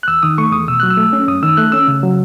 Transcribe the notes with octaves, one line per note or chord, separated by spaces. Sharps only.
F#6
E2 E6
D#3 D#6
A3 C#6
E2 D#6
B2 E6
F#3 F#6
E6
A3
C#4
F#2 D#6
D#3 E6
A3 F#6
C#4 E6
C#3
F#3